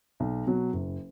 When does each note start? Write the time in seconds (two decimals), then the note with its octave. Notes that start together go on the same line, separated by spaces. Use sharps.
0.20 B1
0.47 B2 F#3
0.73 F#1